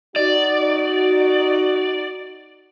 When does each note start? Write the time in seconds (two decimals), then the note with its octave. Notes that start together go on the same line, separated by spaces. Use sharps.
0.16 D#4 F#4 D5